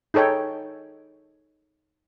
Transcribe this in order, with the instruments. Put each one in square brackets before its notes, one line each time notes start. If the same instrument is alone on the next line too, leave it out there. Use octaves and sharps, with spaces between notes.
[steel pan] D#4 G#4 A4 C#5 G5